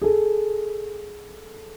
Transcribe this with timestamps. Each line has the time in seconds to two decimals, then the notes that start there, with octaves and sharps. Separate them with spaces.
0.02 G#4 A4